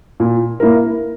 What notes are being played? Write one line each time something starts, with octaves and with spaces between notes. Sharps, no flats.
A#2
A#3 E4 A#4